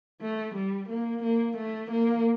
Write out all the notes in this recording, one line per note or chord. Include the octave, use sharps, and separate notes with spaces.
A3
G3
A#3
A#3
A3
A#3